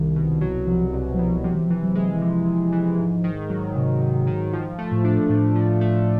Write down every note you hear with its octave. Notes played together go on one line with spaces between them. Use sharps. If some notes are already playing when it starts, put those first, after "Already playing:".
Already playing: C2 D#3
B2
F#3
C2 F3
C2
F#3
B2 F3
C3 F3
E3
E3 F3
F#3
G#3
E3
C3 F3
C3
E3
G#2
D#3
F#3
G#2 C3
G#2
D#3
F3
A3
A2
D4
A2 F3
F3
A3